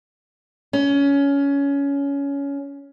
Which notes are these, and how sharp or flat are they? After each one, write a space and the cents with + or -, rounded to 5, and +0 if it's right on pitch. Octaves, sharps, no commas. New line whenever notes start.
C#4 +20